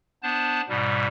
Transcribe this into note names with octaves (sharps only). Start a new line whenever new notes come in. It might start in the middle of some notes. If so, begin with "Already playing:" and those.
B3 D4 C5 A5
G#2 B2 G3